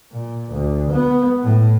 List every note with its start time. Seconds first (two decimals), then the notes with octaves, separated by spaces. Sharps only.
0.12 A#2
0.51 D2
0.91 B3
1.44 A2